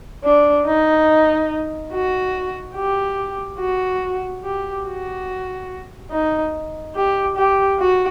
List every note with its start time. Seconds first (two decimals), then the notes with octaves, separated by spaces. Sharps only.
0.24 D4
0.66 D#4
1.92 F#4
2.75 G4
3.59 F#4
4.43 G4
4.86 F#4
6.11 D#4
6.95 G4
7.36 G4
7.79 F#4